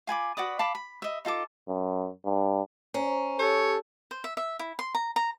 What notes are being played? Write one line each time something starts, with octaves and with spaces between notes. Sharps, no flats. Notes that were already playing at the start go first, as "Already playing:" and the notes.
F4 G#5 B5 D6
F#4 B4 D5 D#6
F5 A5 B5 D6
B5
D#5 E5
D#4 F4 A4 D6
F#2
G2
C#4 C5 A#5
G4 A4 C#5
C5
E5
E5
E4
C6
A#5
A#5